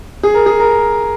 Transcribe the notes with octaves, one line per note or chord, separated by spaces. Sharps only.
G#4
A#4
G#4
A#4